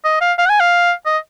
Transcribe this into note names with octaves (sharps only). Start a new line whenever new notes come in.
D#5
F5
F5
F#5
G#5
F5
D#5